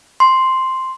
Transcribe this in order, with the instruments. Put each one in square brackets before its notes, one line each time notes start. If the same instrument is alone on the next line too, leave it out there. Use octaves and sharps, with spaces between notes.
[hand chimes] C6